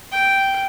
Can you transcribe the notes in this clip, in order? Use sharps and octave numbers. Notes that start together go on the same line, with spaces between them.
G5